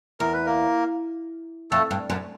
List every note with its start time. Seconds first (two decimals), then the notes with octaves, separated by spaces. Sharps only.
0.20 E2 A#4
0.33 B4
0.46 A#3 A#4
1.71 F2 A3 A4
1.91 G2
2.10 F#2